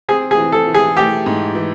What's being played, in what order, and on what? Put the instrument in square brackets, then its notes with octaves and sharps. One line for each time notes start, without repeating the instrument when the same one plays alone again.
[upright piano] C4 [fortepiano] G#4
[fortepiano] G#4
[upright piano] E3
[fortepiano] A4
[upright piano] E3
[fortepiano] G#4
[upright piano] A3 [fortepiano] G4
[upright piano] G#2
E3